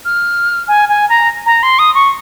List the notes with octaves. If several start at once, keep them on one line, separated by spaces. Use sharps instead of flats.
F6
G#5
G#5
A#5
A#5
C6
D#6
C#6